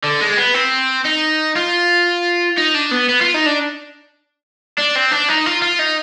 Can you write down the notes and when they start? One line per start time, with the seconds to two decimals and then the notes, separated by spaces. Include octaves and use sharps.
0.04 D3
0.20 G#3
0.37 B3
0.54 C4
1.05 D#4
1.56 F4
2.57 D#4
2.74 D4
2.91 B3
3.09 B3
3.21 F4
3.34 D#4
3.46 D4
4.78 D4
4.95 C4
5.11 D4
5.28 D#4
5.46 F4
5.62 F4
5.79 D#4